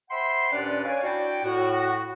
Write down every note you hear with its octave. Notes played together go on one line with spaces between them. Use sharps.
C5 E5 F#5 G5 B5 C6
D#2 A#2 C#4 D4 B4 D5
C#5 D5 F5 G#5
D4 E4 F#4 D5 G5
A2 F#4